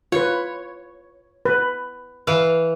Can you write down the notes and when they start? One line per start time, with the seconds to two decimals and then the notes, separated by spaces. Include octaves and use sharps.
0.12 F4 B4 C#5
1.45 B4
2.27 E3 F5